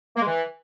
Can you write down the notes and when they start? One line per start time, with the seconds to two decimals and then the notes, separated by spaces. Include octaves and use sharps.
0.16 A#3
0.21 G#3
0.27 E3